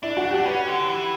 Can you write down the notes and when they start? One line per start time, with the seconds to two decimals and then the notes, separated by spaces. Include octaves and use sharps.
0.03 D4 E4
0.17 F#4
0.31 D4 G4
0.46 C#4 B4
0.68 D3
0.89 E3